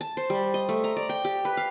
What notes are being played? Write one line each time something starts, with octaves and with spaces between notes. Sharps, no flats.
A5
C5
G3
D#5
A3
A#5
D5
G5
G4
B4
F5